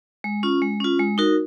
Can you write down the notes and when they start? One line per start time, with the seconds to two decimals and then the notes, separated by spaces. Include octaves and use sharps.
0.24 G#3
0.43 C#4 F4
0.62 G#3
0.80 C#4 F4
0.99 G#3
1.18 D#4 F#4 A#4